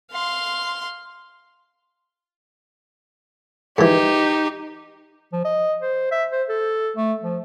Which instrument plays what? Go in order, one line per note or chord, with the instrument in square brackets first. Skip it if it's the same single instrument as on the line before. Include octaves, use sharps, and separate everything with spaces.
[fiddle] F5 C6
[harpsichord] G#2 E3 [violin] D#4 G4
[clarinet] F3
D#5
C5
E5
C5
A4
A3
F3